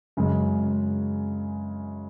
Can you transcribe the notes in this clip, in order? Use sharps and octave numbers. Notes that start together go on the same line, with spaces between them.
F#2 C#3 G#3